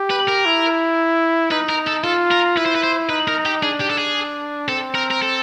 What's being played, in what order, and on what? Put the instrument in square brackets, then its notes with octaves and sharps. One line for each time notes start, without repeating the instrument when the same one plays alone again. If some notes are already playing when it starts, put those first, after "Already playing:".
Already playing: [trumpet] G4
[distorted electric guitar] B4
A#4
[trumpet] E4
[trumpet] D#4 [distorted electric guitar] B4
[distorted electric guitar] A#4
A4
[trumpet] F4 [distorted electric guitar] A4
[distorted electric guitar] A#4
[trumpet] E4 [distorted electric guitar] B4
[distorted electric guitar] C5
B4
C5
[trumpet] D#4 [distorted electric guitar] B4
[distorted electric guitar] A#4
G4
[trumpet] D4 [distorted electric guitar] G#4
[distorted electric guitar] G4
A4
G#4
[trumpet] C4 [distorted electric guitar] A4
[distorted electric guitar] A#4
A#4
A4